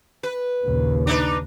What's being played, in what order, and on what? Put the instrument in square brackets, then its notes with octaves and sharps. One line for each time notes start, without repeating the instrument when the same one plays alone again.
[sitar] B4
[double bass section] A#1 D#2 C#3
[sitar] D4 D#4 B4